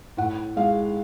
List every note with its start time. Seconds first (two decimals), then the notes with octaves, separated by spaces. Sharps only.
0.17 A2 F#5
0.56 G#3 F5